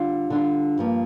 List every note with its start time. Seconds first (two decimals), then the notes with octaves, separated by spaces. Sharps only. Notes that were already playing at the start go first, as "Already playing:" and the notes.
Already playing: D3 G3 D4 F4
0.30 D3 G3 D4 F4
0.79 G2 F3 A#3